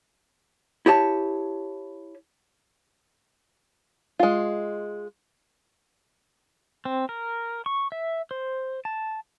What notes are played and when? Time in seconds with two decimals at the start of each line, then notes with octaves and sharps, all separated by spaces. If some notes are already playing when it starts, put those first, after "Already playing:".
0.86 E4 G4 C#5 A5
4.19 G#3 F4
6.85 C4
7.09 A#4
7.66 C#6
7.92 E5
8.31 C5
8.85 A5